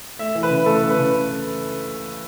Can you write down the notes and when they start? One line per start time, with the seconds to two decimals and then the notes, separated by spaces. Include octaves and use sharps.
0.19 A3 E5
0.35 E3
0.43 B4
0.50 C#3
0.66 A3 A4
0.81 C#3
0.90 B4
0.98 C#3